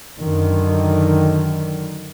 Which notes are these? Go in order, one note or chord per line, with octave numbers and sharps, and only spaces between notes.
F#2 D3 D#3